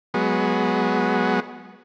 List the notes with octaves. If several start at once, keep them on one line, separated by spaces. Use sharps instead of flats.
F#3 G#3 B3